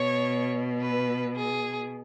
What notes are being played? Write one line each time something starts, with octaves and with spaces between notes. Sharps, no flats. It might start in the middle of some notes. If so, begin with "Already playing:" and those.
Already playing: B2 C#5
B4
G#4